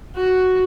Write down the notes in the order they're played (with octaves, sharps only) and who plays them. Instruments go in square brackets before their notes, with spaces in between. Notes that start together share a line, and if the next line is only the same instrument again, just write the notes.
[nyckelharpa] F#4